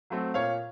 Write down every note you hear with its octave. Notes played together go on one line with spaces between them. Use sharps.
F#3 A3 C4
A#2 C#5 F5